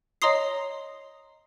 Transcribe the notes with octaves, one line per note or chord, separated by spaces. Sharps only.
C#5 D#5 A#5 C6 D#6 C7